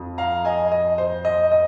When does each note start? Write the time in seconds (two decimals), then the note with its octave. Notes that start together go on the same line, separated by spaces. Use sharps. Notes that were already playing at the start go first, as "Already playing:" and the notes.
Already playing: F2
0.18 F5 A#5
0.45 D#5 G#5
0.72 D#5
0.98 C5
1.25 D#5
1.52 D#5